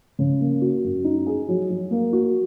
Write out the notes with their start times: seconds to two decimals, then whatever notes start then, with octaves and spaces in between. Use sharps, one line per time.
0.19 C#3
0.40 A#3
0.61 F#4
0.84 F#2
1.04 D#4
1.26 G#4
1.48 F#3
1.70 F#3
1.91 A#3
2.13 F#4